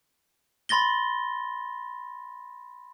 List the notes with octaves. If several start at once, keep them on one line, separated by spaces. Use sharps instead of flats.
B5 C6 A6 A#6 G7